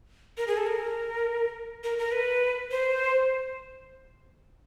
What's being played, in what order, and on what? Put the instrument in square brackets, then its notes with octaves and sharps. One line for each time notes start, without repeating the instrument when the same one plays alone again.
[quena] A#4
G#4
A4
A#4
A#4
A#4
B4
C5